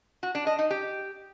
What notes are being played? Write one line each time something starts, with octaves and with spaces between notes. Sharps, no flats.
F#4
D4
D#5
D#4
G4